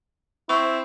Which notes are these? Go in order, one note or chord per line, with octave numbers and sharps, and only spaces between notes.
C4 E4 C#6